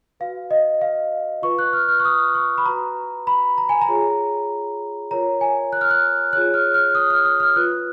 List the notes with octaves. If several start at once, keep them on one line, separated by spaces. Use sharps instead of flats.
F#4 B4 F5
D#5
F5
F4 B4 C#6
F#6
F6
F6
C#6
D#6
C#6
B5
F#4 B4 A#5
B5
A#5
G#5
A#5
F4 G#4 C#5
F4 A#4 C#5 A#5
G#5
F#6
F6
F#6
F4 G#4 C#5 F#6
F6
F6
D#6
F6
D#6
F6
F4 B4 F#6